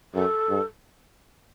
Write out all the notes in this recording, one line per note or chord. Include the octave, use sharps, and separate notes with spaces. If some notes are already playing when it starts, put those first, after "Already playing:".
F#2 A4
G2